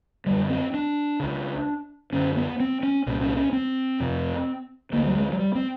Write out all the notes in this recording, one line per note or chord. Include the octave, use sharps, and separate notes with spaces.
F#2 D3 G3
C4
D4
C#2 C#3
F#2 D3 C#4
B3
C4
C#4
C2 A#2 C#4
C#4
C#4
C4
F2 C3
D2 D3 A#3
G3
G#3
F#3
G3
C4